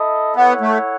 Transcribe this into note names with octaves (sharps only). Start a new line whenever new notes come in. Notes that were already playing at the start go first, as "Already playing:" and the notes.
Already playing: E4 A4 D#5
B3 E4 A4 C#5 F#5
A3